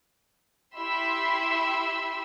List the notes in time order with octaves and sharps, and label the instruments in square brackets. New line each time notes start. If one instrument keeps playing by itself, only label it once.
[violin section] E4 G4 E5 B5 C6 E6